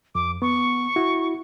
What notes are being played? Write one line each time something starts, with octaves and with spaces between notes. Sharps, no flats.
F2 D6
B3 C#6
E4 F#4